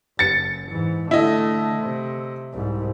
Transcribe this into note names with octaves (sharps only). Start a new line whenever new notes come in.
F#1 A6 C#7
G#2 E3
D3 A3 E4 D#5
C3
C2 G#2